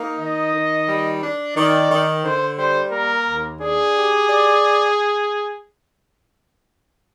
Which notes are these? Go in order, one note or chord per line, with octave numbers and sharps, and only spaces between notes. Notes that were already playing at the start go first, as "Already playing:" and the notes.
Already playing: A#3 D#4
D#3 D#5
D#3
G3
D4
D#3 D5
D#3
D3 C5
G3 C5
A#3 A#4
D#2
D4 G#4
G4
D5